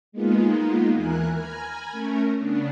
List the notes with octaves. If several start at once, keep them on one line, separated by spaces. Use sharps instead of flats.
G#3 A#3 B3 D#4 F4
D#2 E3 A#4 G#5 F#6
G#5 A#5 B5 F6 G#6
A3 C#4 A#4
C#3 B3 D4